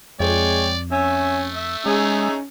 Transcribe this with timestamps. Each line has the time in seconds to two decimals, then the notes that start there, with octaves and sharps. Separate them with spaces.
0.20 F2 G#3 C#5 D5 G5
0.92 A3 C#4 E5
1.54 E5
1.86 G#3 C#4 D#4 G#4 E5